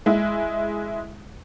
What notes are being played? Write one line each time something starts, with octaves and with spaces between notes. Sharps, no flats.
G#3 E4